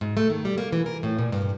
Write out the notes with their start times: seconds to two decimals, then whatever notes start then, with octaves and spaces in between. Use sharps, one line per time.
0.01 G#2
0.17 A3
0.30 D#3
0.45 G3
0.58 A#3
0.72 E3
0.86 A#4
1.03 A2
1.18 A#2
1.32 G2